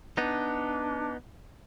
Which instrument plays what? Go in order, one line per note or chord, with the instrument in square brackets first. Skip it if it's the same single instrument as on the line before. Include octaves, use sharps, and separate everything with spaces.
[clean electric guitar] B3 D#4 [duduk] D4